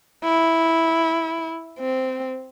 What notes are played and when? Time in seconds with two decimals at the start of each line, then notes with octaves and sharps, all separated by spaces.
0.25 E4
1.80 C4